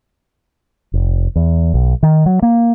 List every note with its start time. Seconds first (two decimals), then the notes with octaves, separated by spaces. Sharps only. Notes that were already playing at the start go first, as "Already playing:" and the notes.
0.94 F1
1.36 E2
1.74 B1
2.03 D#3
2.26 F#3
2.42 A#3